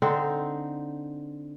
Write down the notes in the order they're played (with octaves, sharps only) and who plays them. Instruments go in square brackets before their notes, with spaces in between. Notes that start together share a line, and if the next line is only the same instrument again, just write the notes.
[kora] D3 C4 D#4